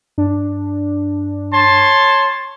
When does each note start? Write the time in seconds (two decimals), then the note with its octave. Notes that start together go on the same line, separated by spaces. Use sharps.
0.18 G2 D4
1.54 C#5 A5 C6